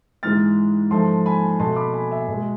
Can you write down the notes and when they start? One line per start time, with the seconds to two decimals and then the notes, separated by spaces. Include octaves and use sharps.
0.23 G#2 E3 G#3 F6 A6
0.91 G#2 F3 A3 A5 C6
1.26 G#5 B5
1.60 B2 A3 A5 C6
1.76 B5 D6
1.94 G#5 B5
2.11 E5 G#5
2.28 B2 G#3